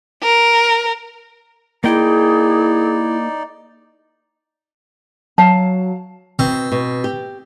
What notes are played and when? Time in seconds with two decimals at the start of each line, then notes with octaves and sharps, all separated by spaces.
0.23 A#4
1.84 A#3 D#4 E4 G#4 D5 G5
5.38 F#3 F5 A5
6.39 B2 C4
6.72 B2
7.04 G4